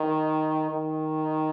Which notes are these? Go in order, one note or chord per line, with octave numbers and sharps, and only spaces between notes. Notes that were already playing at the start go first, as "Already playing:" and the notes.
Already playing: D#3
D#3